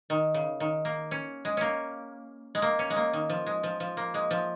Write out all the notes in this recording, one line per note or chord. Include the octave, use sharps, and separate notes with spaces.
D#3
C#3
D#3
A#3
C#4
G#3
A#3 C#4
G#3
A#3
C#4
G#3
A#3
D#3
F3
G#3
F3
F3
A#3
G#3
F3